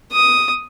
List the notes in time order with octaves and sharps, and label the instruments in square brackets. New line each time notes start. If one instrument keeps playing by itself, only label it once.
[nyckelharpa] D#6